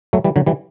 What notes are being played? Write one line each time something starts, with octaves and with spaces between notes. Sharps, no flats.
F#3 A3
E3 G3
D3 F#3
E3 G3